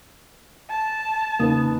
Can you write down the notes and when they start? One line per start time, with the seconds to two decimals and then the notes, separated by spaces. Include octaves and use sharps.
0.70 A5
1.40 E2 C#3 A#3 D#4 B4 D#6